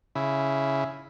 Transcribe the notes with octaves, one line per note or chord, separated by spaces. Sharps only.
C#3 E4